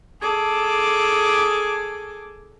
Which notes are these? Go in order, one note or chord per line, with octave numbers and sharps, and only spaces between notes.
G#4 A4 D6